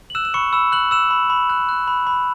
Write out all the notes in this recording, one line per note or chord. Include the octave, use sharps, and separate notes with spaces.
F#7
E6 F#6 E7
E7
B5 C#6 C#7
B5 E6 E7
F#6 F#7
E6 F#6 E7
B5
B5
F#6
F#6
B5
B5